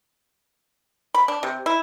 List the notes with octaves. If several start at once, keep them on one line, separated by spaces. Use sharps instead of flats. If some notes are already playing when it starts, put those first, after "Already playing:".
B5
D4
C3
E4